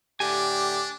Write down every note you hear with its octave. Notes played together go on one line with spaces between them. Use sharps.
A2 D3 D4 G4 G#5 D6